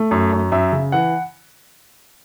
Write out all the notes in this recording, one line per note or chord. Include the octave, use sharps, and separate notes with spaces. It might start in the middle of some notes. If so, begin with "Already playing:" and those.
Already playing: A3
F#2
F#2
F#2 E5
C#3
E3 F#5